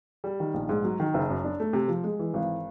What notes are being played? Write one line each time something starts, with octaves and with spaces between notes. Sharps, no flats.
G3
D#3
A#1
G#2
F#3
D#3
F#1
F#2
D4
A3
C3
F3
G#3
E3
G#1